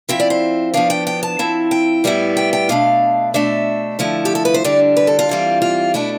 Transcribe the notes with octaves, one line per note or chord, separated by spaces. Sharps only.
F3 C4 E4 E5
D5
C5
F3 B3 D4 F5
G5
G5
A5
F3 C4 E4
G5
A2 G3 B3 E4
G5
G5
B2 A3 D4 F5
B2 A3 D4 E5
D3 F3 A3 E4
G4
A4
B4
C5
D3 G3 D4 D5
B4
A4
F4
E3 G3 C4
F4
B2 A3 D4 E4